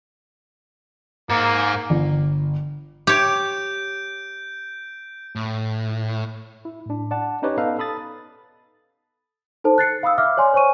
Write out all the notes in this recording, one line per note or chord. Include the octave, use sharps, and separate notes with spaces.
G#2 A#3
G1
G4 C#5 G6 D7
A2
E4
A2 D4
D5 F#5 A5
C#4 D#4 G4 B4 C#5 D5
B3 D#4 A4 B4 F5
A4 B5 D#6 A6
D#4 A4 C5 A5
F#6 A6 C7 C#7
F5 B5 D#6 E6
E5 F5 D6 E6 F6
C#5 D5 G#5 C6
C5 C#5 G#5 C#6 D#7